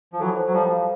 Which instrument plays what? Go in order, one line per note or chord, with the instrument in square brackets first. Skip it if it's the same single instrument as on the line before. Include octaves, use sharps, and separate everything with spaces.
[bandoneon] F3
[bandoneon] E3 F#3 [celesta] A4
[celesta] C5
[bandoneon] F#3
[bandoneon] F3 G3 [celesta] A#5
[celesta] F5